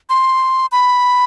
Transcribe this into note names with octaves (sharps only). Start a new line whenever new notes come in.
C6
B5